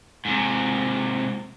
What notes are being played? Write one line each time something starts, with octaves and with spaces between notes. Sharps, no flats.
G#2 C3